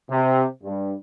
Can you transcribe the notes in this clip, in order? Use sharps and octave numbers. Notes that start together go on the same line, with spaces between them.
C3
G2